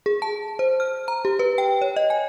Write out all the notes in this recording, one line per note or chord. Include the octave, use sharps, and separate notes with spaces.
G#4
A5
C5
F6
A#5
G4
B4
G5
C#5
D#5
G#5